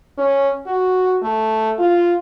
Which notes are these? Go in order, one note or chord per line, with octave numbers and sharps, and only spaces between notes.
C#4
F#4
A3
F4